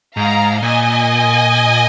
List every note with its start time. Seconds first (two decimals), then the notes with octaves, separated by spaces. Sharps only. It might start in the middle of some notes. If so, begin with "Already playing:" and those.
0.17 G#2 F5 A#5
0.62 A#2 D#5 G#5